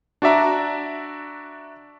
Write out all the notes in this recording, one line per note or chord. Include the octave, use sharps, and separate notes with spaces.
D4 F#4 D5 E5 A#5